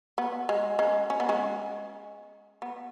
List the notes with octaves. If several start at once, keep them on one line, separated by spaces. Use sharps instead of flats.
B3
G#3
G#3 C#4
C#4
B3
G#3 C#4
B3